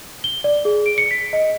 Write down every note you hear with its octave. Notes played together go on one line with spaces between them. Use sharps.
G7
D5
G#4
D7
C#7
B6
D#5